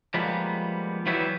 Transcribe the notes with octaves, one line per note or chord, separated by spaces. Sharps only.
F3 G3 G#3 A#3 B3
E3 F#3 G3 B3 E4